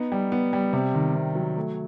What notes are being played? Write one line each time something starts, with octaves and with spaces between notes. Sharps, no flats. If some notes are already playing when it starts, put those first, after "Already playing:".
Already playing: B3 D#4
G3
B3
G3
C3
D#3
C3
F#3
A3